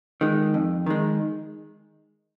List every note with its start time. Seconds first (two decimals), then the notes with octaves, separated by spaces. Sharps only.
0.21 D#3 G#3
0.54 F2
0.86 D#3 G#3